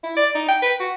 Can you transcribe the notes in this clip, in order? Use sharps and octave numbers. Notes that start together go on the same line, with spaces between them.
E4
D5
D#4
G5
B4
F#4